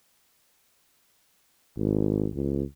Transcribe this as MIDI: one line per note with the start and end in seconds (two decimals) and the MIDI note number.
1.77 2.28 32
2.34 2.63 37